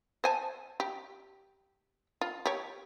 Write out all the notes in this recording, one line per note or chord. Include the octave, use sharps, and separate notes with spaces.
C5 G#5 A5
G4
F4
G4 C#5